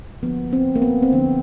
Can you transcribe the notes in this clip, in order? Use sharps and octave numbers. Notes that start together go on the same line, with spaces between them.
D3 F3 A#3 B3
C4
A#3
B3
C4
D3 F3 A#3 B3